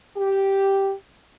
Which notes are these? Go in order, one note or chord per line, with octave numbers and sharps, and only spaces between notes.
G4